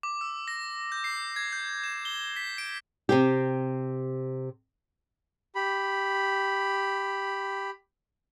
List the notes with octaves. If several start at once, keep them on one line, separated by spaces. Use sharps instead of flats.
D6
E6
A#6
G6
C7
G#6
G6
E7
G7
B6
D7
C3 C4 G4
G4 B5